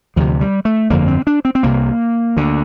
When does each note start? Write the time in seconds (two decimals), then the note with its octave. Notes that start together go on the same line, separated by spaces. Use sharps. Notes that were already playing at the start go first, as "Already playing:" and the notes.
0.16 D2 C3 F3
0.41 G3
0.65 A3
0.90 G1 F2 D3 A#3
1.08 C4
1.27 D4
1.45 C4
1.55 C4
1.63 C2 C3 A#3
2.37 D2 D3